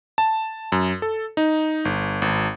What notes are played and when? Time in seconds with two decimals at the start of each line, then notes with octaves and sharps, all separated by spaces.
0.18 A5
0.72 F#2
1.02 A4
1.37 D#4
1.85 G1
2.22 G#1